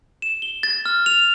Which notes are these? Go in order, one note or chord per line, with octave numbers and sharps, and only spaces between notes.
E7
G7
A6
F6
F7